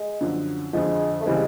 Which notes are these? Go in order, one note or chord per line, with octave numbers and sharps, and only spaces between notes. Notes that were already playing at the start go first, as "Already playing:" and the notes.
Already playing: G#3
F#2 D3 F3
F2 D3 F3 G#3
A3
C#3 E3 G3 G#3 C4